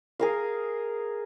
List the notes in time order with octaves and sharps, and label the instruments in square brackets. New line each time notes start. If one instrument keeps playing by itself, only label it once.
[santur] G#4 A#4 F5